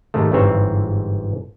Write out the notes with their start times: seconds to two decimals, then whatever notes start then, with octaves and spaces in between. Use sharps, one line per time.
0.14 G#2 C3 D#3 A3
0.32 G1 G#2 E3 C4 C#5 E5